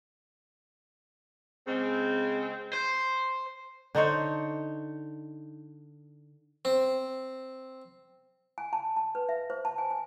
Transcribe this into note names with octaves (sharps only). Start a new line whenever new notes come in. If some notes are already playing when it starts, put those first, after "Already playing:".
C#3 G#3 C4
C5
D3 D#4 C5 C#5
C4
G#5
A5
A5
B4
E5
C5
A5
G#5
G#5